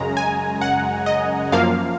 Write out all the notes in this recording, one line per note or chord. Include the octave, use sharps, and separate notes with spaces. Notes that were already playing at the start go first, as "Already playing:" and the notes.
Already playing: F#2 C#3 G#3 A#5
G#5
F#5
D#5
F#2 F3 A#3 F5